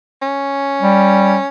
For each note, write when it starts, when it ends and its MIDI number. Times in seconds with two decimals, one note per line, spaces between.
0.22 1.49 61
0.82 1.37 55